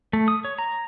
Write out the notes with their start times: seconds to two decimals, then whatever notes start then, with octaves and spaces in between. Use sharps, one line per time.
0.13 A3
0.28 D#6
0.45 C#5
0.58 A#5